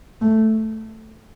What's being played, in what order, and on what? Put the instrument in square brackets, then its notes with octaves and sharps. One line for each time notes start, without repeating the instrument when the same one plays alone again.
[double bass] A3